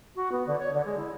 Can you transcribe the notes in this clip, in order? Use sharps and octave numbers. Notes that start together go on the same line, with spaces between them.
F#4
B3
D3
C#5
D3
G#3
E4